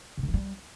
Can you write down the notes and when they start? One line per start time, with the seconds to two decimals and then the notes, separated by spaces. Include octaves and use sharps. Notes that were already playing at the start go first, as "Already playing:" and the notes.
0.17 C#3
0.23 D3
0.28 F#3
0.34 G3